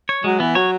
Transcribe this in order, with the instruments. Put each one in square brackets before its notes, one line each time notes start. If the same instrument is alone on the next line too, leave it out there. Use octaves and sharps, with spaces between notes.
[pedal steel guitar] C#5
[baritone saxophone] F#3 [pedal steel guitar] G#3
[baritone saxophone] E3 [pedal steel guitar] B3
[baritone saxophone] F#3 [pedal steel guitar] C#5